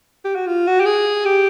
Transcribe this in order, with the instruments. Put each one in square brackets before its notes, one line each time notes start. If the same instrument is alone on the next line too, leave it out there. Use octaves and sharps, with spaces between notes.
[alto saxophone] G4
F#4
F4
F#4
G4
G#4
G4